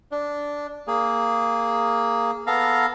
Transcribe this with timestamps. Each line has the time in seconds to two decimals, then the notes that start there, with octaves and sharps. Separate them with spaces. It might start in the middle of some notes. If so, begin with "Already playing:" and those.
0.12 D4
0.87 A#3 G#4
2.47 B3 A4 F5 A#5